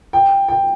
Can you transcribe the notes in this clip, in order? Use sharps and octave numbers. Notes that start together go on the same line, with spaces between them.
G5
G5